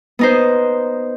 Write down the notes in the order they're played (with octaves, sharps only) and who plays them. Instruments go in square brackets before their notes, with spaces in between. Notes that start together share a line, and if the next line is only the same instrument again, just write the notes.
[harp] B3 D#4 C5